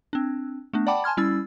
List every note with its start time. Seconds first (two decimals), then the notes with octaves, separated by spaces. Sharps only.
0.13 C4 D4
0.73 A3 B3 D4
0.87 D5 F#5 G5 A5 B5 D6
1.04 G#5 A5 C6 F6 G#6
1.17 G3 C#4 E4 E6 A6